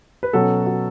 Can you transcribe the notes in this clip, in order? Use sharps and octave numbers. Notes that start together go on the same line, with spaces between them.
B4
B2 F#3 C#4 F#4 A4
F#4